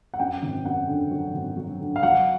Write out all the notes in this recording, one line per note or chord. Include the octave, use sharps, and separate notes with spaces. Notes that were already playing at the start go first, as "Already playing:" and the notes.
F#5
F#2 G5
G#1
F#2 F#5
D3
F#3
G#1
F#3
D3
F5
F#3 F#5